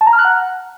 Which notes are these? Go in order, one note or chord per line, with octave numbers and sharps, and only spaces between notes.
A5
A#5
F6
F#6
F#5